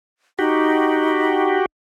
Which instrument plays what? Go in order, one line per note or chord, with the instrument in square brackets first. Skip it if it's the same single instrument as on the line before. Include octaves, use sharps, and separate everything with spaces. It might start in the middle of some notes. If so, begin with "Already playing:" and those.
[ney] D#4 [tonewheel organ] F#4 G4